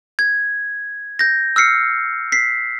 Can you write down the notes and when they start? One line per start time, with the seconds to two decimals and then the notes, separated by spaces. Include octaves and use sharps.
0.19 G#6
1.19 G6 A#6
1.56 E6 F6 C7 C#7
2.32 B6 C7